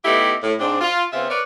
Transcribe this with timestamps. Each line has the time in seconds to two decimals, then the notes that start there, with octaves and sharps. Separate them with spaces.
0.05 A3 B3 D#4 E4 G4
0.43 A2
0.59 G#2 C4 D4
0.81 F4
1.13 C#3 B3 C4 F4 C5 E5
1.30 A#4 B4 C#5 D5